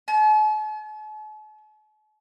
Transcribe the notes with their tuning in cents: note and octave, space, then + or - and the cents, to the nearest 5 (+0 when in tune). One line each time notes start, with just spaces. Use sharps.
A5 -45